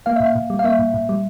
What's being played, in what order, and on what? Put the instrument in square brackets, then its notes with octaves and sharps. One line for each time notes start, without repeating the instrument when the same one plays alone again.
[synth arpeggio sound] A#3 F5
A#2 E5
F5
A#2
G3
F5
A#3 E5
A#2
A#2
G3